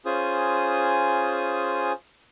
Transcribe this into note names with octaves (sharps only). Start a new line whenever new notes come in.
C#4 F4 G#4 C5 G#5 D#6